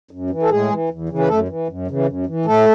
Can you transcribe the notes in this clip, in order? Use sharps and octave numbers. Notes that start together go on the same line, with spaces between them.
F#2
E3
A4
A2 G#3 G#4
E3
E2
C#3 E3
B4
F#2 A3 A4
E3
F#2
C#3 E3
F#2
E3
A2 A3 A4